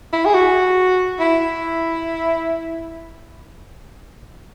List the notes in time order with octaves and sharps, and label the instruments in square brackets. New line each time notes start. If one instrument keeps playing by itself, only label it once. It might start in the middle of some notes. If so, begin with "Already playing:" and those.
[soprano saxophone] E4
G#4
F#4
E4